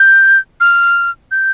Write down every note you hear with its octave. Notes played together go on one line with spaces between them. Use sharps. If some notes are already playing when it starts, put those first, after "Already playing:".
Already playing: G6
F6
G6